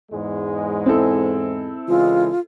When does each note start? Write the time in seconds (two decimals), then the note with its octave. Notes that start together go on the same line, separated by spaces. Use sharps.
0.12 E2 G#2 G#3
0.86 C4 E4 A4
1.88 C#3 E3 G#3 F4